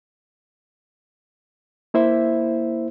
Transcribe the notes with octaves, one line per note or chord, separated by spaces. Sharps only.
A#3 E4 C5 E5